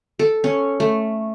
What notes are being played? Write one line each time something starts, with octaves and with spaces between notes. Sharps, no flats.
A4
C#4
A3